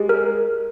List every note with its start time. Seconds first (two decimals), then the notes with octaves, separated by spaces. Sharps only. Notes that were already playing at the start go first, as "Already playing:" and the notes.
Already playing: G#3 G4
0.09 A#4